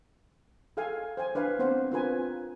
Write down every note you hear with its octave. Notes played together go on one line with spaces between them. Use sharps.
G#4 A4 F5 G5 G#5
C5 G5 G#5
D4 B4 C5 F5
B3 C4 D4 C5 F#5
C4 D4 F4 A#4 B4 G#5